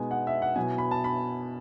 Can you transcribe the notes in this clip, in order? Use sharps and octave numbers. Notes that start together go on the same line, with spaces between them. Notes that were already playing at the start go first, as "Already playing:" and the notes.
Already playing: B2 G#3 B3 D#4 G#5
F#5
E5
F#5
B2 F#3 B3 E4 G#5
B5
A5
B5